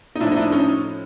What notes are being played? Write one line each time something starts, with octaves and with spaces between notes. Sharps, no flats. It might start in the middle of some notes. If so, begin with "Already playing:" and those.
D#4
A2 F3 D4 E4
D#4
D4 E4
C#4 D#4